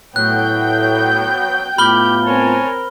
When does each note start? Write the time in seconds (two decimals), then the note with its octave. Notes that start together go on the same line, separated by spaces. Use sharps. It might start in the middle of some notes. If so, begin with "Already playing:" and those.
0.16 A2 F#3 B3 G5 F#6 G6
1.78 A2 B3 F4 G4 B5 F6 G7
2.25 C4 A#4 C#5 G#5 A5